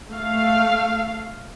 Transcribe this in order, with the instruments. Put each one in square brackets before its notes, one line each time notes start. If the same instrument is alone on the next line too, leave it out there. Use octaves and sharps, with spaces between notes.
[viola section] A3 F5